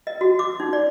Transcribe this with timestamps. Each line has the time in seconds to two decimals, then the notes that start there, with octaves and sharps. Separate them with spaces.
0.07 D#5
0.21 F#4
0.39 D6
0.60 D#4
0.73 D5